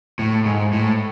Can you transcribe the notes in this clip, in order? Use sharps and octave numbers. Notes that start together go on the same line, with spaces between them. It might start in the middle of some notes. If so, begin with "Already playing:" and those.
A2
G#2
A2